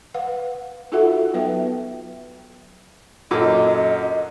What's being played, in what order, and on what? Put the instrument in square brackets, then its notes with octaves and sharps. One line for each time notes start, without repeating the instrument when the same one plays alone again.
[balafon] B4 F5 F#5
D#4 F4 F#4 A4 E5 F#5
F#3 B3 B4 E5 G5
[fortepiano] F#2 D3 D6 [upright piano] A#2 [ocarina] D#5